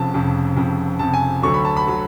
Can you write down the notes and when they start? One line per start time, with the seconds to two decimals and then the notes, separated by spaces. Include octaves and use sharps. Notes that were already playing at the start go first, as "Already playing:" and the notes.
Already playing: F1 F2 C#3 A5
0.14 F1 F2 C#3
0.57 F1 F2 C#3
0.99 F1 F2 C#3 A5
1.14 G#5
1.42 D2 D3 F#3 C#6
1.54 B5
1.65 A5
1.77 B5
1.87 D3 F#3